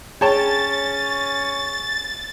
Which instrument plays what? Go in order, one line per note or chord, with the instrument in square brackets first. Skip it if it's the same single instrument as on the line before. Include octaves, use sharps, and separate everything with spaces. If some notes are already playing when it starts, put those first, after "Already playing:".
[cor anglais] C#4 [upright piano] G#4 [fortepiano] C#5 G5 A5 [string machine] A6